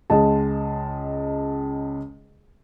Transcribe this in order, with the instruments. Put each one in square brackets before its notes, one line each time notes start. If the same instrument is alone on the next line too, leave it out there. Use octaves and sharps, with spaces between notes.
[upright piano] C#2 G#3 D#5 A5